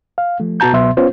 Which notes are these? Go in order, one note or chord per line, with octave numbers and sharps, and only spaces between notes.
F5
F3 A3
B2 B3 F#4 A5 A#5 G6
C#2 B2 F#3 B3 E5 C6
B3 C#4 F4 C5